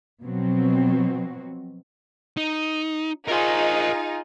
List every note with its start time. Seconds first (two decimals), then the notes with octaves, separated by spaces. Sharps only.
0.22 B2 F3 F#3 C4 F#4
2.37 D#4
3.28 D#4 F4 G#4 A#4 C5